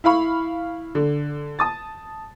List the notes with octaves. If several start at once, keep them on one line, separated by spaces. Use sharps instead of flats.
E4 F5 B5 C#6
D3
A5 D#6 A6